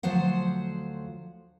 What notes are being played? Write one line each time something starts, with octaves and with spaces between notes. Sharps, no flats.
D2 F3 F#3 C5 F#5